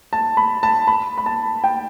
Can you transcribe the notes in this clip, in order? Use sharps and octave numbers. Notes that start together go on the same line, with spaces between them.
A5
B5
A5
B5
B5
A5
G5